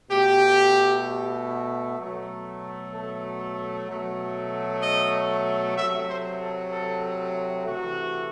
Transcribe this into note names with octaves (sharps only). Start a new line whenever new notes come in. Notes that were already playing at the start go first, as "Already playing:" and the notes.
B2 A3 G4
B2 F#3 A3
A4
B2 F#3 A3
D#5
C3 F#3 A3 E5
C5
A4
A4
C3 E3 A3 F#4